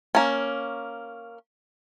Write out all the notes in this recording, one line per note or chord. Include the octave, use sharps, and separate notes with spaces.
A#3 C#4